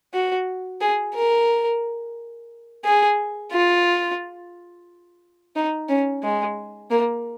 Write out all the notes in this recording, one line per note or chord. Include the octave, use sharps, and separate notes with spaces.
F#4
G#4
A#4
G#4
F4
D#4
C#4
G#3
A#3